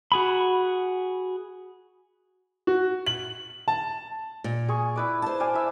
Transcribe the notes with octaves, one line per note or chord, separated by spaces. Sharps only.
F#4 G#4 B5
F#4
F#7
A5
A#2
G#4 C#6
E4 B4 D5
C5 A5
D5 F5 G#5
E4 E5